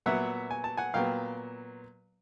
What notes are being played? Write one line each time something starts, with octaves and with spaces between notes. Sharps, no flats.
A#2 F#3 B3 E5 F#5
G#5
A5
F#5 G#5
A#2 F#3 B3 F5 G5